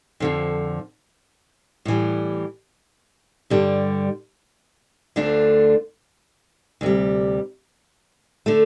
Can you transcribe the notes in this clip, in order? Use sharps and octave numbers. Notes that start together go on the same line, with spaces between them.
F2 D3 F3
A2 E3 G3
G2 D3 G3
D2 D3 A3 D4 F4
D2 C3 G3
D3 A3